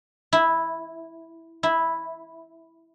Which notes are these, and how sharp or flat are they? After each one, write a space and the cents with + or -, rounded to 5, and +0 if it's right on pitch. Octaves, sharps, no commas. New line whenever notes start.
E4 -5
E4 -5